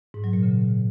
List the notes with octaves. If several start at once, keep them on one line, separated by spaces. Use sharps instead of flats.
G#2
F#3
A#2
C#3